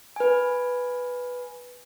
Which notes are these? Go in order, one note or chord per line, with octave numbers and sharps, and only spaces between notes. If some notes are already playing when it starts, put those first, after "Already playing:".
B4 G#5